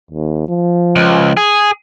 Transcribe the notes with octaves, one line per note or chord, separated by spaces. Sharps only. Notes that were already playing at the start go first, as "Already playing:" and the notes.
D#2
F3
C#2
G#4